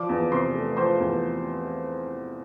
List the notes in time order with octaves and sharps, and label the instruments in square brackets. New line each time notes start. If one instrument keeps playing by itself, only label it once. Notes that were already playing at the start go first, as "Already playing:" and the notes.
Already playing: [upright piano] F3 D5 D6
E2
C3 C5 C6
A3
F3 C5 C6
E2